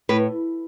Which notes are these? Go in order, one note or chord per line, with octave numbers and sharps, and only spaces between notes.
A2 B4